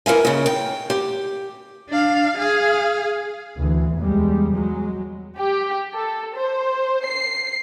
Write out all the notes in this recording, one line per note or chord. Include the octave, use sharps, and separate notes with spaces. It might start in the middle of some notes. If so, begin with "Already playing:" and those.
E3 A#4 E5 G#5
D#2 C#3
G5
G4
D4 F5
G#4 F5
D2 E3
E2 G3 G#3
F#3 G#3
G4
A4
C5
C7